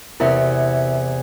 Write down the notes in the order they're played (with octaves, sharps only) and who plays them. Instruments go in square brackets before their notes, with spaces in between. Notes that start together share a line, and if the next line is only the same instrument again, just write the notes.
[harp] E2 C3 [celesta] E4 A#4 E5